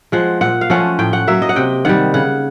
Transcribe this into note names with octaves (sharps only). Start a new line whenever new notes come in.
F3 G#3 F#5
A#2 F#5
F5
F3 A3 C#4 F#5
A2 G5
F#5
F#3 A#3 E5
D#5
F#5
C3 G5
D#3 G3 F#5
C#3 F#5